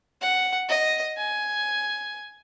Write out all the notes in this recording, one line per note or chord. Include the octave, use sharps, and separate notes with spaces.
F#5
D#5
G#5